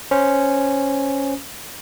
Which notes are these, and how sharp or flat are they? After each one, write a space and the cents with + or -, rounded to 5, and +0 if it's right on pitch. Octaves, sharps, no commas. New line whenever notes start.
C#4 +0 C5 +0